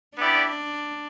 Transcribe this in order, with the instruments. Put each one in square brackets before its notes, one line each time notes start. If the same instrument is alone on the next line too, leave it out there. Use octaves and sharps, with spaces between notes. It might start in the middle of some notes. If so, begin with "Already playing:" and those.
[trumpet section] B3 E4 G4 D5 [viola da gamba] D4